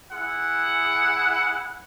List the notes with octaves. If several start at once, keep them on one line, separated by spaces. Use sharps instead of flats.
E4 G#4 F#5